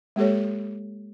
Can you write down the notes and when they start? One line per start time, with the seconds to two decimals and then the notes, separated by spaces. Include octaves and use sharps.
0.16 G#3 A#3 G4 A4 C#5